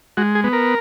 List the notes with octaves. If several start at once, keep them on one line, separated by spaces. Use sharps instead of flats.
G#3 F#4
G#4
B3
A#4